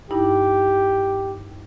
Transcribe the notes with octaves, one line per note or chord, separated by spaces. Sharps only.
G2 D#4 E4 G4